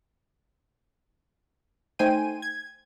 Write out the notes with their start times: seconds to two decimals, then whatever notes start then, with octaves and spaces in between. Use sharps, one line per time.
1.99 A3 D#4 C5 G5 G#5 D#7
2.42 G#6